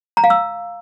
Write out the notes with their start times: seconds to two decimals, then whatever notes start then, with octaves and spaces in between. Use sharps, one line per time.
0.17 A#5
0.24 F5
0.30 E6